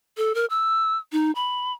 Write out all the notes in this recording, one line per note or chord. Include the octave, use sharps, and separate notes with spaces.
A4
A#4
E6
D#4
B5